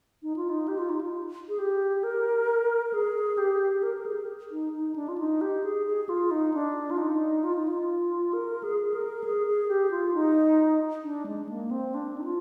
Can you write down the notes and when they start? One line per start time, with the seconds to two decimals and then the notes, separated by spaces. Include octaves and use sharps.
0.23 D#4
0.36 F4
0.50 D#4
0.68 G4
0.79 F4
0.90 D#4
1.01 F4
1.49 G#4
1.59 G4
2.04 A#4
2.86 A#4
2.93 G#4
3.38 G4
3.83 A#4
3.98 A#4
4.06 G#4
4.51 D#4
4.73 D#4
4.96 D4
5.08 F4
5.18 D#4
5.41 G4
5.64 G#4
5.86 G#4
6.09 F4
6.31 D#4
6.54 D4
6.91 F4
6.98 D#4
7.44 F4
7.55 D#4
7.68 F4
8.33 A#4
8.64 G#4
8.94 A#4
9.24 G#4
9.47 G#4
9.68 G4
9.91 F4
10.14 D#4
11.04 D4
11.26 G#3
11.49 A#3
11.71 C4
11.95 D4
12.18 D#4
12.24 F4